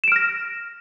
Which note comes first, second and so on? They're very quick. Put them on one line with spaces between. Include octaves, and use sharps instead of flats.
E7 D7 F6 A#6